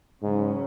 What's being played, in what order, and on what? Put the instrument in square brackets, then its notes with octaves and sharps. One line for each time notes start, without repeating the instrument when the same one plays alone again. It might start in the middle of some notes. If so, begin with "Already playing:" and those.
[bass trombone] G#2 [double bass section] C#3 F#3 C#4